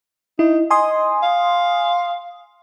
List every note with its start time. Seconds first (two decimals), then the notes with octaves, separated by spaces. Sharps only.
0.39 D#4 E4
0.70 D#5 G#5 C6 D#6
1.23 F5